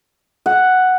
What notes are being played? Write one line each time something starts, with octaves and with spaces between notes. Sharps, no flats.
F#5